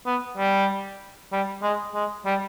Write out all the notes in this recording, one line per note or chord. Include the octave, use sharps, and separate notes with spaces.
B3
G3
G3
G#3
G#3
G3